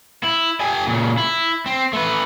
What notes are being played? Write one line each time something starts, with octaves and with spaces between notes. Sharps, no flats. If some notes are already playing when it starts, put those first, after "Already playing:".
E4
G4 G#5
A#2 C#3
E4
C4
A3 B4